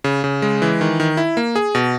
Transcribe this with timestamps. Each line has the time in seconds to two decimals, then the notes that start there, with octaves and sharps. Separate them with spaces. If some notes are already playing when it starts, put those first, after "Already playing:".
0.04 C#3
0.24 C#3
0.42 G#3
0.62 E3
0.81 D#3
1.00 D#3
1.17 E4
1.37 A#3
1.56 G#4
1.75 B2